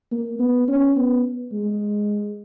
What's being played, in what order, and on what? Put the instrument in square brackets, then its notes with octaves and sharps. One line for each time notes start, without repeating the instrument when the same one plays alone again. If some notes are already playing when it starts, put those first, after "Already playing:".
[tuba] A#3
B3
C#4
B3
G#3